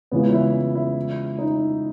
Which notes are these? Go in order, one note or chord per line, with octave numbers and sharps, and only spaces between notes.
C#3 E3 G#3 B3 C#4 F4
E4
E4
D#4